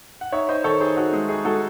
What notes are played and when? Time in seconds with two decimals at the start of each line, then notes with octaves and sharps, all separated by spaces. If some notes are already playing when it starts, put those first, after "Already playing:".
0.21 F#5
0.32 D#4 C#5 E5
0.49 D#4 C5 D#5
0.64 D#3 A4 C#5
0.81 D#4 G#4 C5
0.97 D#4 F#4 A4
1.13 G#3 G#4
1.29 D#4 G#4
1.45 G#3 F#4 A4